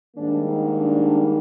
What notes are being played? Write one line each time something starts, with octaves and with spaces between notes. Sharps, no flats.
G#2 D#3 G3 A#3 D4
D#4
D4